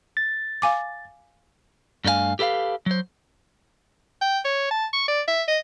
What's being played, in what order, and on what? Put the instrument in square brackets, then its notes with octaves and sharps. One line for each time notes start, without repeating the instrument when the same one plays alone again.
[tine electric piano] A6
[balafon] F5 G#5 D6
[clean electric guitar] G2 A3 D4 D#4 F5 G#5
G4 A4 B4 E5 F5
F#3 C5
[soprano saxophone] G5
C#5
A5
C#6
D5
E5
D#5